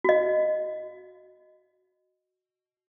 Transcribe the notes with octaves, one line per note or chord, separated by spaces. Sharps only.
F#4 D#5